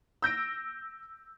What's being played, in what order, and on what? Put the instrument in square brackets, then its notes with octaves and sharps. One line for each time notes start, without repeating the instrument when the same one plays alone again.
[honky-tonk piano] E6 G6 A#6 D7